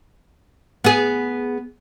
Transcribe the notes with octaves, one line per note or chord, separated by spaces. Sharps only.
B3 G#4